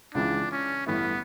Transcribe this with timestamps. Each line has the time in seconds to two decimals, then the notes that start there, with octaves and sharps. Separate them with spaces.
0.14 C#2 C#3 E3 D4
0.51 C#4
0.86 A1 G2 D3 A3 B3 E4